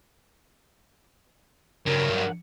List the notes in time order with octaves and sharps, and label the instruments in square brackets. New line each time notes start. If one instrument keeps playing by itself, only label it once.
[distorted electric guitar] G2 F#3 [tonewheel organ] C#3 [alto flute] A#4
[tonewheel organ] F#5